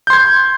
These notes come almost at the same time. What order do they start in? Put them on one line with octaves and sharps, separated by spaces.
G6 C6 G#6